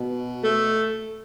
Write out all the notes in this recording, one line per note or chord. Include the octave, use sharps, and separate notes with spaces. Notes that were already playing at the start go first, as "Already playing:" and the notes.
Already playing: B2
A3